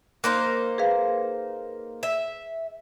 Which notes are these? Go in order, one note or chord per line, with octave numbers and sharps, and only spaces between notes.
A#3 D#4 C5 F#6
G#4 B4 F5
E5